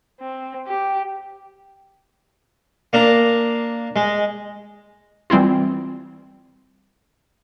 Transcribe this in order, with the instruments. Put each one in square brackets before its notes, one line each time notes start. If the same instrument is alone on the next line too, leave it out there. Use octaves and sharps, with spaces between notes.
[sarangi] C4
G4
[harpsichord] A#3 D4 A#5
G#3
[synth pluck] E3 G3 C4 E4 F4